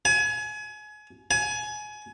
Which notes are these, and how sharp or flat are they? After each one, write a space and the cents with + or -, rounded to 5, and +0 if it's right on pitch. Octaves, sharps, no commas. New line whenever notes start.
G#5 +30
G#5 +25